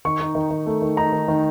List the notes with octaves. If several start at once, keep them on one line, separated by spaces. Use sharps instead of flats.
D#3 C#6
D#4
D#3
D#3
A3
D#3
D#4 A#5
D#3
D#3